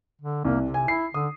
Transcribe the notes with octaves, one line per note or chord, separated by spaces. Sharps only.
D3
C2 A#3
C3
G#5
E4 C7
D3 D#6